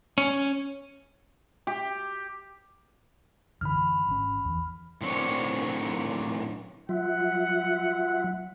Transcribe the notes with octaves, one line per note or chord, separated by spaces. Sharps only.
C#4
G4
F#2 D3 E3 B5 F6
G#1 C#4
E2 E3
A2 D#3 F#3 C4 D4 C#5
F#3 F4 E5 F#5